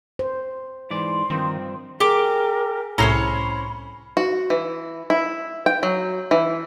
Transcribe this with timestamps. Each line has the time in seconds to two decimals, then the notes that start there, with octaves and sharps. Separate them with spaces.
0.19 C5
0.90 G#2 E3 D5 C6
1.30 G2 D#3 F3 C4
2.00 G4 G#4 A#4 D6
2.98 C2 A2 C#4 C5 C#5 A#5 B5
4.17 F#4
4.50 E3
5.10 E4
5.66 G5
5.83 F#3
6.31 E3